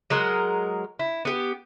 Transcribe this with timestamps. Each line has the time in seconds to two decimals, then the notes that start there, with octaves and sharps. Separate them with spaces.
0.10 F#3 G#3 A#4 F#5
0.99 E4
1.25 B3 G4